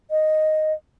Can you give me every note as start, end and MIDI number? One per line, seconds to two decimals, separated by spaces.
0.11 0.73 75